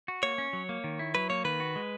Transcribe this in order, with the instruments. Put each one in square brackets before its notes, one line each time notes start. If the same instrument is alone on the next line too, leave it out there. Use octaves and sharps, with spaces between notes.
[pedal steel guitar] F#4
[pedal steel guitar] A#3 [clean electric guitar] C#5
[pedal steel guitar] C#4
F#3
A#3
D#3
E4
[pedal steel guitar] F#3 [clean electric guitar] B4
[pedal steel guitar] A#3 [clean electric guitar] C#5
[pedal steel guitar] D#3 [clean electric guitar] B4
[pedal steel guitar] F#4
G#3